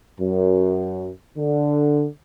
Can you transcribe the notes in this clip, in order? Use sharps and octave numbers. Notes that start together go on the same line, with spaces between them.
F#2
D3